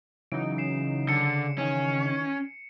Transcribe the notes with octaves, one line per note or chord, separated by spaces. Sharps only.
C#3 E3 F#3 D#4 D7
C7 E7
D3 C#7
D#3 E3 C#4